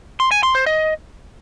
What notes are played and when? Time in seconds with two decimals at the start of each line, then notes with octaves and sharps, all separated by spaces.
0.20 C6
0.31 G#5
0.43 C6
0.55 C5
0.66 D#5